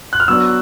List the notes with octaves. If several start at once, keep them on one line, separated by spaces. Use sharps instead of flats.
F#6
F6
F#3 B3 D4 E6